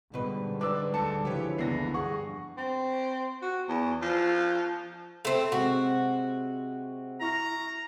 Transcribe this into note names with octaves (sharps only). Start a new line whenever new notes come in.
G#2 B2 D3 G3 B4
G#3 D4 B4 D5 D6 E6
D2 A4 A5 C#7
C#2 D3 E3 F3 G4 B4 C#5
F#1 B3 D4 A#6 C7
G2 G#4 F#5 C#6
C4
F#4
E2
F3
A3 C4
C3 G#3 C4 F#4
E4 A#5 C#6 F6